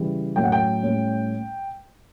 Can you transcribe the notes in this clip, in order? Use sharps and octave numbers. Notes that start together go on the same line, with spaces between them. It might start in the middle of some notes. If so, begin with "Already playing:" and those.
Already playing: C#3 E3 G3
A2 F#3 C#4 G5
F#5
G5
A2 G3 C#4